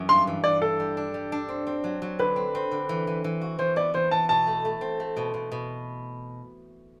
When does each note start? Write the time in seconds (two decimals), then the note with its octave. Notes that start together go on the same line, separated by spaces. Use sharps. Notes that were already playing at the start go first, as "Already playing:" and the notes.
Already playing: F#2 E3
0.09 G2 C6
0.27 E3
0.44 E3 D5
0.62 D4 A4
0.80 G3
0.97 D4
1.14 G3
1.32 D4
1.49 C4
1.67 C4
1.84 F#3
2.02 F#3
2.19 D3 B4
2.36 C4
2.55 C4
2.71 D3
2.89 E3
3.07 E3
3.24 E3
3.41 F#4
3.59 E3 C5
3.76 B3 D5
3.94 E3 C5
4.11 E3 A5
4.29 B2 A5
4.47 A3
4.65 A3
4.81 C4
5.00 A3
5.17 B2
5.34 B2
5.52 B2